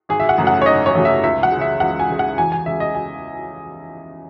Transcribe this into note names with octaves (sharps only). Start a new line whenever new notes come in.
G#1 G#4
E5
F#5
F#2 C#3 F#3 A3
F#5
C#5
G#1 D#5
C#5
F#2 C#3 F#3 A3
E5
C#2 E5
F#5
G#3
C#3 E5
C#2 F#5
G#5
C#3 G#3
F#5
E2 G#5
G#5
C#3 G#3 E5
D#5
G#5